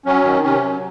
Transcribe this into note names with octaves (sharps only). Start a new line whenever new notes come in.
F#3 C#4
D#3
C3 C#4
F#3